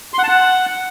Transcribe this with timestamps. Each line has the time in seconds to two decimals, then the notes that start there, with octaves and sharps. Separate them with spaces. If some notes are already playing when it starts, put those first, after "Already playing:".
0.13 C6
0.19 F#5
0.24 A5
0.29 F#5